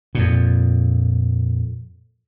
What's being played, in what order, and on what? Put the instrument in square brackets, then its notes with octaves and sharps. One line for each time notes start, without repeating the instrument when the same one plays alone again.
[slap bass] F2 A#2